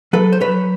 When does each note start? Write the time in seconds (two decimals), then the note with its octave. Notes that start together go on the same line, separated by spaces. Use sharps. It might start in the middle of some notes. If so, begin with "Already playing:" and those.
0.13 F#3 A4 B4
0.33 C5
0.40 F#3 B4 C#5